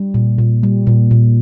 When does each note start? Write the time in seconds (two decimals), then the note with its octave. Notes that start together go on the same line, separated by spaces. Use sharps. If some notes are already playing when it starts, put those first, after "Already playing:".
Already playing: G3
0.14 A#2
0.38 A#2
0.63 G3
0.87 A#2
1.11 A#2